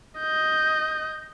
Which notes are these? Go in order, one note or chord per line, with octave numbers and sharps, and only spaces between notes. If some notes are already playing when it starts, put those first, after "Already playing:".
D#5 G6